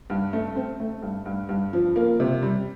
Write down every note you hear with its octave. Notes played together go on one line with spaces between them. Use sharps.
G2
A3
C4
A3
G2
G2
G2
F3
A#3
C3
G3